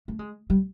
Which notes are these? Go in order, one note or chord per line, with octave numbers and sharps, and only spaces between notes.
A3
G#3
G3